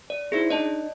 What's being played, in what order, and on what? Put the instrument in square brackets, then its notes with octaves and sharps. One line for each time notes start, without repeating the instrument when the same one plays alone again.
[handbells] D5
[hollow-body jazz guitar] D#4 E4 C5 [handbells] G#4
[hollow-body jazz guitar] D4 D#4 [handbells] D5 D#5 A5